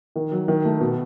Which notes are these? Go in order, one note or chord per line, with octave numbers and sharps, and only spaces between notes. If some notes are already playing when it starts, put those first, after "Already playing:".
D#3
F#3
D#3
A3
B2